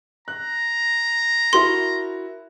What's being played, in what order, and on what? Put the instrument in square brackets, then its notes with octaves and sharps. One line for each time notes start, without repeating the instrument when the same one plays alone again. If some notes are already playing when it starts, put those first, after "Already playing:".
[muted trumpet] A#5 [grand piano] F#6
[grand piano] E4 F#4 A#4 [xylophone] C6